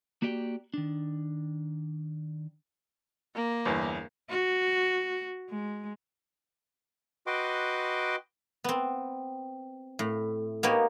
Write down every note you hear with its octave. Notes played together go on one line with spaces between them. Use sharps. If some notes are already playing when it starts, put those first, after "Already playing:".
A#3 F#4 G4 D5 D#5 G5
D#3 D4
A#3
G1 E2
F#4
G#3
F#4 B4 D#5 G5 C6 D6
B3 C4
A2
A#3 B3 D#4 G4 C#5